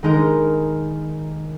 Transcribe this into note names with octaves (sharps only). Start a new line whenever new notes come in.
D#3 G#3 D#4 A#4